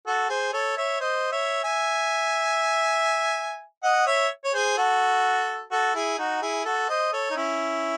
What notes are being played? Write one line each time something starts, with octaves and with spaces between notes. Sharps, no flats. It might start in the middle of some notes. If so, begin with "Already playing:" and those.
F#4 A4
G#4 C5
A4 C#5
C#5 E5
C5 D#5
C#5 E5
E5 G#5
D#5 F#5
C#5 E5
C#5
G#4 C5
F#4 A4
F#4 A4
E4 G#4
D#4 F#4
E4 G#4
F#4 A4
C5 D#5
A4 C#5
D#4
C#4 E4